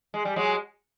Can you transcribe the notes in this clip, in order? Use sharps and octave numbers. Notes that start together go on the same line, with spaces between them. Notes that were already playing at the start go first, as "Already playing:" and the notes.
G#3
G3
F#3 G#3